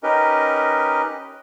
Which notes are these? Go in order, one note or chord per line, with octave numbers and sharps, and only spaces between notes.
C#4 D#4 G4 A#4 B4 D#5